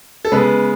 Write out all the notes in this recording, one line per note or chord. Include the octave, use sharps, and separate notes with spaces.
A4
C#3 G#3 B3 B4